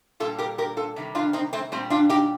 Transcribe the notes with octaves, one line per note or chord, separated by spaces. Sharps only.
A#2 G3 F4 A4
G4 A#4
G4 A#4
F4 A4
C3 D#3 G3
D4 F4
C4 D#4
A3 C4
A#2 G3 A3 C4
D4 F4
D#4 G4